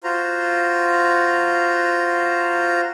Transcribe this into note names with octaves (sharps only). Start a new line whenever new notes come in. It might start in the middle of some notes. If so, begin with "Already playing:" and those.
F4 F#4 C5 A#5